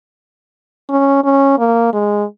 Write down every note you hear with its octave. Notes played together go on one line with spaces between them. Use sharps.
C#4
C#4
A#3
G#3